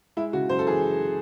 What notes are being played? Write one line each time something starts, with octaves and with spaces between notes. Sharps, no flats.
G#3 E4
C#3 F#4
F#2 C5
A4
E3 G#4